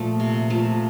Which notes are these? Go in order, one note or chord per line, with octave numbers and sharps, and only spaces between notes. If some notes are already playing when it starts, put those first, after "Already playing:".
Already playing: A#2 F3 A3
C3
F3 A3